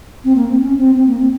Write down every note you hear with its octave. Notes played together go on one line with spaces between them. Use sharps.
C4
A#3
C4
C#4
C4
C4
A#3
C4